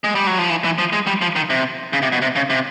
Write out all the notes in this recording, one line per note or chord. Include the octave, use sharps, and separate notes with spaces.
G#3
G3
F#3
F3
E3
E3
F3
G#3
G3
F3
D#3
C3
C#3
C3
B2
C3
C#3
C3